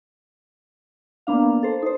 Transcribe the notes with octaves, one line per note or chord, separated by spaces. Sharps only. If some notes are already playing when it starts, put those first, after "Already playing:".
A#3 B3 D4 F5
A4 C5
D#4 C5